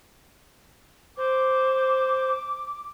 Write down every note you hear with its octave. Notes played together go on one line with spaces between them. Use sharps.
C5 D6